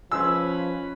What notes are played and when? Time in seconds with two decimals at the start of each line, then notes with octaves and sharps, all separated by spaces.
0.12 F3 G#3 C#4 B4 G#5 B5 E6